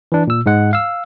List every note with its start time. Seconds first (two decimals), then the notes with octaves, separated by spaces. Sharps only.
0.12 E3 D4
0.27 A#2 E6
0.46 G#2 G#3 F#5
0.73 F5 E6